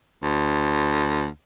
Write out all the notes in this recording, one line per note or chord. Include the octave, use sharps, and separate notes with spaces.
D2